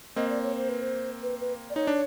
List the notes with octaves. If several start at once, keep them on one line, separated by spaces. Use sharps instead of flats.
A#3 C4 D#5
D5
C#5
C5
B4
C5
B4
B4
D5
D#4 C#5
D4